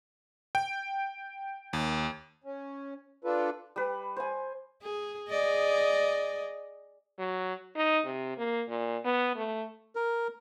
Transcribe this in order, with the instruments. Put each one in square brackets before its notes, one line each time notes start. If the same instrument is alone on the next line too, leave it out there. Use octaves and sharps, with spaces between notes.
[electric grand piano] G5
D#2
[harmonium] C#4
D4 F4 A4 B4
[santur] G3 B4
C5 G#5
[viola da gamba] G#4
G#4 D5 D#5
[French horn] F#3
D#4
C3
A#3
A#2
B3
A3
[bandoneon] A#4